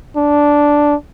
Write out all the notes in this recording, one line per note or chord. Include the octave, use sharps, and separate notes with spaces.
D4